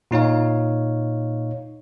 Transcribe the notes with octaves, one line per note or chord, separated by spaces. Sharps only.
A#2 D#4 C#5 F5